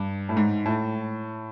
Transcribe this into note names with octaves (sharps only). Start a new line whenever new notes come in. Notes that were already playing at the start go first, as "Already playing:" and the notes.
Already playing: G2
A2
G#2
A2